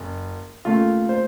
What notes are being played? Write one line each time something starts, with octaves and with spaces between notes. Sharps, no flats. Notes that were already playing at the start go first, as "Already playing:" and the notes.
Already playing: F#1
D#2 C#3 A3 F4
C5